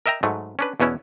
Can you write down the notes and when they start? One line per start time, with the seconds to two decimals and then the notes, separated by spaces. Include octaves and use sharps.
0.06 A#4 D#5 E5 G5 A#5
0.23 G#2 F#3 A3
0.59 C#4 D4 B4
0.80 E2 B2 B3 C#4 E4